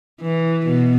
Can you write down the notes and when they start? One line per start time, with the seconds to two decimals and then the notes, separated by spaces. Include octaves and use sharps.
0.21 E3
0.66 B2